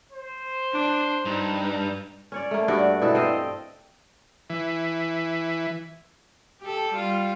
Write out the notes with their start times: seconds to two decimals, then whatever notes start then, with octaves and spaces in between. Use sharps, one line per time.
0.12 C5
0.72 D4
1.25 G2 D#4
2.32 C#4 C#5 D5
2.51 A3 A#3
2.68 G2 F#4 D5
3.02 B2 E3 A4
3.15 C4 D#5 F5 G5
4.50 E3
6.61 G4 A4
6.92 G3 F4